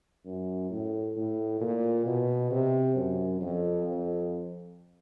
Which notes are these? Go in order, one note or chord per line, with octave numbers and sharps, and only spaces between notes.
F#2
A2
A2
A#2
B2
C3
F#2
F2
F2